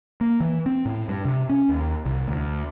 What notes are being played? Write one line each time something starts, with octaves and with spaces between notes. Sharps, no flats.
A#3
E3
C4
A2
G2
C3
C#4
D#2
C2
D2